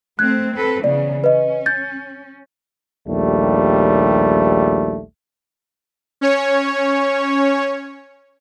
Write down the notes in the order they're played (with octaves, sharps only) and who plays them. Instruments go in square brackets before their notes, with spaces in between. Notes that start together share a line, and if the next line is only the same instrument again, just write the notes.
[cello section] A3 C4 [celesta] F#6 G#6
[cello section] C4 A4 B4
[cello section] C#3 E3 B3 [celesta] D5
[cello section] C#4 [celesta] B4 D#5
[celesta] G6 A6
[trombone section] A#1 D#2 G3 A3
[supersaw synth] C#4 C#5